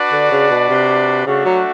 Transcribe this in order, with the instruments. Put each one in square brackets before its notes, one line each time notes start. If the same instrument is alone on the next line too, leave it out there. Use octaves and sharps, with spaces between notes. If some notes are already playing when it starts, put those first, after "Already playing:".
Already playing: [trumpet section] D4 F#4 B4 D5
[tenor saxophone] D3
C#3
B2
C3
[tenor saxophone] C#3 [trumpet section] A3 D4 F#4
[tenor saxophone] F#3